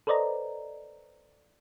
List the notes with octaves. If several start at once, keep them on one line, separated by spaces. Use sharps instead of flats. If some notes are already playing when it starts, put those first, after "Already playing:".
A4 B4 C5 D5 D#5 A#5